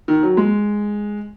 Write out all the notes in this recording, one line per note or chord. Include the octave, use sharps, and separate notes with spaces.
D#3
F#3
G#3